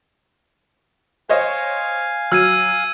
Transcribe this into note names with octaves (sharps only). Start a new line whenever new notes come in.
C5 C#5 D#5 F5 G#5
F#3 E6 F6 G#6 D#7